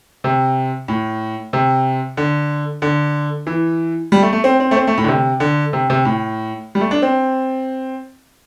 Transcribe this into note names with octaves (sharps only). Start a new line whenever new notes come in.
C3
A2
C3
D3
D3
E3
G3
A3
A3
C4
C4
A3
C4
A3
A2
D3
C3
D3
C3
C3
A2
G3
A3
D4
C4